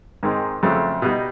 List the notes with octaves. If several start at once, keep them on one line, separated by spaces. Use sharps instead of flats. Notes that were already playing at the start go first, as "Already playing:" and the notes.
G#2 D#3 G#3 C4
F2 C#3 F#3 A3 C4
B2 G3 B3 D#4